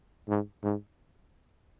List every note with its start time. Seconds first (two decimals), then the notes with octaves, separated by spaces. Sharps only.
0.28 G#2
0.63 G#2